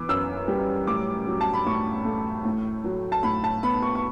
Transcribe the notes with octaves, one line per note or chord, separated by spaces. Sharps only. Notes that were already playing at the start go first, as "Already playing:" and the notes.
Already playing: E3 B3 D6
F#2 E6
G3
A2 D6
F#3
A5
B5
A2 C#6
A3
A2
F#3
A5
A2 B5
A5
B3 B5
C#6
C#6